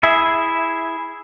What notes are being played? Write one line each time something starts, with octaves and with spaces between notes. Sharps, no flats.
E4 G#4 E5